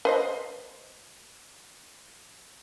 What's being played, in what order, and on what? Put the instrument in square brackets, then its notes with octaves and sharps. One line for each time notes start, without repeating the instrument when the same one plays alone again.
[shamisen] B4 C5 D#5